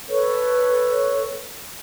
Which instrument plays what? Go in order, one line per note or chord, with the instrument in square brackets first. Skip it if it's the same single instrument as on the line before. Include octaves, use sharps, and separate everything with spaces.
[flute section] A4 B4 C#5 C#6